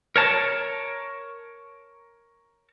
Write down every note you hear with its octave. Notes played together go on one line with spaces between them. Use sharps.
A#4 C#5 A5